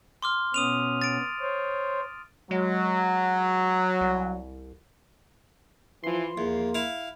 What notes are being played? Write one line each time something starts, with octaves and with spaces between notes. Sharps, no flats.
C6 D6 F6
B2 B3 C#4 D#6 D#7 F7
A6 D7
C5 C#5
F#3 G#3
C2
E3 F3 C6
E2 A#3
E4 F5